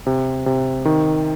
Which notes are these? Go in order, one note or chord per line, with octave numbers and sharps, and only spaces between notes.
C3
C3
D#3